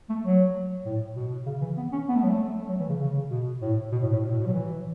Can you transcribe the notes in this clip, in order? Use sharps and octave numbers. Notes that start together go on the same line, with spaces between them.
A3
F#3
A2
B2
C#3
E3
B3
C#4
B3
A3
F#3
A3
A3
F#3
E3
C#3
C#3
B2
A2
B2
A2
A2
B2
A2
B2
F#3
E3